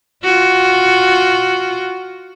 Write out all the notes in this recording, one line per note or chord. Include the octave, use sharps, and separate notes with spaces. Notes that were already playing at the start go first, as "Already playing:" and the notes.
F4 F#4